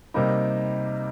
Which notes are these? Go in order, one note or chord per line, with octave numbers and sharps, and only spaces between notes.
C3 G3 A#3 D#4